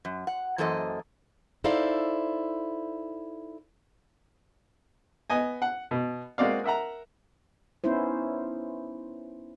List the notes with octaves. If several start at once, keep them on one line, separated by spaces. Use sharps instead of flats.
F#2
F#5
F#2 E3 A#3 A4 C5 D#5
D#4 E4 A4 C5 D5 F5
B3 D#5 G#5
F#5
B2
G#3 A#3 C4 F#4 D5 F5
A#4 E5 F#5 A#5
B3 C#4 D#4 E4 C5